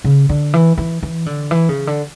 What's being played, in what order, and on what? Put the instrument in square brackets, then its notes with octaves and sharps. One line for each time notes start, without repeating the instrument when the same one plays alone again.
[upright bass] C#3
D3
E3
E3
E3
D3
E3
C#3
D3